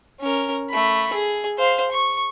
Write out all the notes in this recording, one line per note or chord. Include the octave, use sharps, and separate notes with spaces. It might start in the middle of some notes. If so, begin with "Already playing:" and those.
C#4 A#4
A3 B5
G#4
C5 F5
C#6